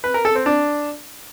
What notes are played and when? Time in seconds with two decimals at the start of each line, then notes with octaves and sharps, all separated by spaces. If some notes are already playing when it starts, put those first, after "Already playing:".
0.04 B4
0.14 A#4
0.25 A4
0.35 C4
0.46 D4